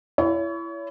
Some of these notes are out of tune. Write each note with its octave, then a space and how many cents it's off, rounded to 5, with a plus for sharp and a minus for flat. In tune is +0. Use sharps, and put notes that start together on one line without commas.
E4 +20 C#5 +35